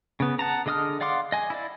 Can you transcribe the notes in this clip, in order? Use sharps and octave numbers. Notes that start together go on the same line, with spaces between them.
C#3 B3
F#5 A5 A#5
D3 G#4 D#5 D#6 F6
D5 F5 F#5 C6 D6
D#5 G#5
E4 D5